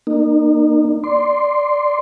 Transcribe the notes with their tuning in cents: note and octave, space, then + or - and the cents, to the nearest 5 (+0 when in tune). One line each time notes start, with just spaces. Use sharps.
A#3 +5 D#4 -40
D5 +0 C6 +0